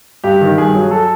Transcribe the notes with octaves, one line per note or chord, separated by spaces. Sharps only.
G2 G4
D#3
G2 G#4
F#3
A4